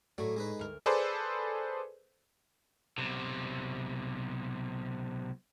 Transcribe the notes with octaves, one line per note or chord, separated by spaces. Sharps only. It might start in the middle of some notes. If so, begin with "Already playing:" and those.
A2 F#3 A3 D5
G#3 D#4 B4
D2 A#4
G#4 A4 B4 C5 D5
B1 C3